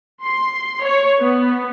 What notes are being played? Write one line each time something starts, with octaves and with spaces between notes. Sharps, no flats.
C6
C#5
B3